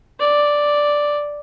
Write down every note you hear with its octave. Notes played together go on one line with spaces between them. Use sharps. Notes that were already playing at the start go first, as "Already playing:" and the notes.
D5